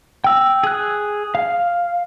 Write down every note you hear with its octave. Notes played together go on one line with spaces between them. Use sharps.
G5 E6
G#4 F#6
F5